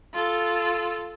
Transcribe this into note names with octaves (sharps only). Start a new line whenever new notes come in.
F4 A4